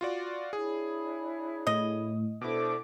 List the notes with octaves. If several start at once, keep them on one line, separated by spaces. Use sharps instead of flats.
F4 F#4 D5
D4 E4 G#4 C#5
A2 D#5
B2 D4 E4 A4 C5 D6